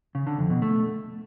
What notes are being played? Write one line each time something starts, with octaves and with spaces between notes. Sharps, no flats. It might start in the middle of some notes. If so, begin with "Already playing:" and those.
C#3
D3
F2
B2
A3